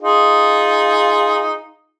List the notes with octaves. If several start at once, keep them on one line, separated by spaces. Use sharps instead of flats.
D#4 F4 G#4